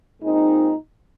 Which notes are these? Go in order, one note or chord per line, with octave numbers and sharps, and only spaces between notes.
A#2 G#3 C4 D#4